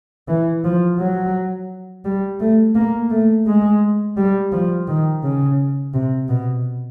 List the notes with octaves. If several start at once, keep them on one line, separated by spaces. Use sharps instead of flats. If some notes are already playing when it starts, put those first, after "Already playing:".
E3
F3
F#3
G3
A3
A#3
A3
G#3
G3
F3
D#3
C#3
C3
B2